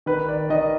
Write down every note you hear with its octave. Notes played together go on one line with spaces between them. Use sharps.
D#3 B4
D5
D#3 D#5